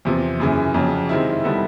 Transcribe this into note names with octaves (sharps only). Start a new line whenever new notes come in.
E2 C3 F3
F#2 C#3 E3
F2 C#3 F#3
C3 D#3 G#3 C4 E4
D#3 G3 B3 E4 A4